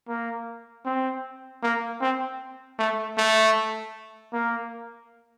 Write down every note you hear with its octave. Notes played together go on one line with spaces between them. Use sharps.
A#3
C4
A#3
C4
A3
A3
A#3